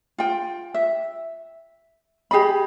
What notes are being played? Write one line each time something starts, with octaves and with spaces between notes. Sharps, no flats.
F4 G5
E5
G4 G#4 D#5 B5